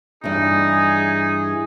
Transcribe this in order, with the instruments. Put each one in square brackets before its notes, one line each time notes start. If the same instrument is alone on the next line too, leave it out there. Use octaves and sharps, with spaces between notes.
[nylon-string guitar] G2 E3 [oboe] D#4 [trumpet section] G#4